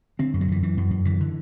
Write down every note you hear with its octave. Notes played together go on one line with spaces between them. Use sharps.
D3 C4
F#2
F#3
F#2 E3
F#2 E3
F#2
F#2
D3 E3
D3